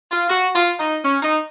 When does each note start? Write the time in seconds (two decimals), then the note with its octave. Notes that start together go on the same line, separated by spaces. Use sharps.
0.11 F4
0.29 F#4
0.54 F4
0.78 D#4
1.03 C#4
1.22 D#4